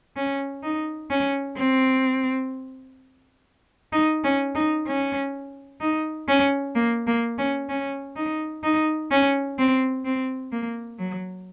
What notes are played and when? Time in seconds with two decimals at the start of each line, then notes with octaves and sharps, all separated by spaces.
0.17 C#4
0.63 D#4
1.10 C#4
1.57 C4
3.93 D#4
4.24 C#4
4.55 D#4
4.87 C#4
5.81 D#4
6.28 C#4
6.75 A#3
7.07 A#3
7.38 C#4
7.69 C#4
8.17 D#4
8.64 D#4
9.11 C#4
9.58 C4
10.05 C4
10.52 A#3
10.99 F#3